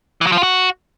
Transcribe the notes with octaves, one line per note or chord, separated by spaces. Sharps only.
E3
F#3
F3
F4
F#4